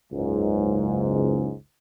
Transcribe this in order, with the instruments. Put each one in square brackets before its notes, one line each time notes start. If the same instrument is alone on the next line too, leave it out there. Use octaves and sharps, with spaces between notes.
[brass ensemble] F#1 C#2 G#2